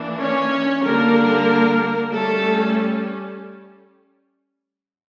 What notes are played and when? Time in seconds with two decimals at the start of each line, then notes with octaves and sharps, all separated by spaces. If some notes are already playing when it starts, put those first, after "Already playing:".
Already playing: E3 A#3 D4
0.19 C#4 C#5
0.84 D3 G3 A#3 D4 A#4
2.13 G3 A3 C#4 A4